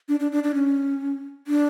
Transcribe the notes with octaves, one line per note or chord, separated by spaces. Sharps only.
D4
D4
D4
D4
C#4
D4